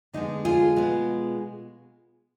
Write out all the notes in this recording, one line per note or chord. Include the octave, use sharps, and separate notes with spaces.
D3 F3 G#3 B3 D#4
F4 G#4
B2 G#3 B3